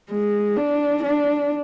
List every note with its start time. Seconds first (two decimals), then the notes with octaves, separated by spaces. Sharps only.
0.11 G#3
0.56 D4
1.03 D4